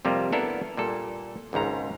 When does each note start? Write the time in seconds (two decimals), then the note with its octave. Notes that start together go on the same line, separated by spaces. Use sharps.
0.05 F2 C3 G3 A#3
0.32 B3 D4 E4 A4 A#4
0.77 A#2 G3 A4
1.53 G#1 C#2 G#2 A#5